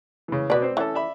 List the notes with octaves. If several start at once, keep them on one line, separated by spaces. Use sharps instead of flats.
C#3 E3
B2 B4 D5
C4 C5
E3 C#4 A4
D5 E5 B5